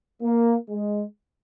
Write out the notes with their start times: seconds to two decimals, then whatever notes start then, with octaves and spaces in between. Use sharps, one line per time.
0.22 A#3
0.70 G#3